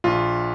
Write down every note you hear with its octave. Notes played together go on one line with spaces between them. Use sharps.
A#1 F4